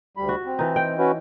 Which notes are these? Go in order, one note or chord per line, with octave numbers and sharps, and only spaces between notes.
D2 G3 B5
F#4
C4
E3 D#4
G5
C#4 F#4 B4